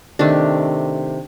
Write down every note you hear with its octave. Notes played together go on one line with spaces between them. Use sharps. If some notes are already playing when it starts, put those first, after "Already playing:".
C3 D#3 A3 D4